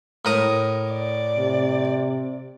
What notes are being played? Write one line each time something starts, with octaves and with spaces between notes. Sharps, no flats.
A2 A#4 D#6
D5
C3